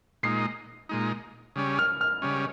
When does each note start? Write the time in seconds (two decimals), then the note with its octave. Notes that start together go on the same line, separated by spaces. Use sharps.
0.23 A#2 G#3 D#4 C7
0.89 A#2 G#3 D#4
1.56 C#3 G3 C#4
1.79 F6
2.01 F6
2.22 C#3 G3 C#4